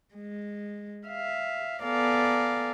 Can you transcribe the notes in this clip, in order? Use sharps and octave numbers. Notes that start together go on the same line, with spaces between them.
G#3
E5 F5
B3 A4 D5 F5 G#5 A#5